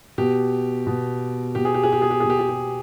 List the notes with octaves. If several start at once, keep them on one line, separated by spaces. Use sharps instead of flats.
B2 G4
B2
B2 G4
G#4
G4
G#4
G4
G#4
G4
B2 G#4
G4
G#4
G4